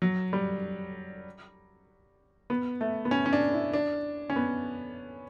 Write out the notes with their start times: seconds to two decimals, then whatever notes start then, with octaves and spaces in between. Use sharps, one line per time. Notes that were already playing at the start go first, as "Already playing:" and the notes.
0.02 F#3
0.33 G3
2.50 B3
2.81 A3
3.05 B3
3.11 C#4
3.26 C#4
3.33 D4
3.53 E4
3.73 D4
4.30 C#4
4.36 B3